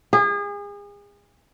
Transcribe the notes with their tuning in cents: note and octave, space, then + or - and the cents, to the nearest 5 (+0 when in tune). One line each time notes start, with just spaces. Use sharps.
G#4 -35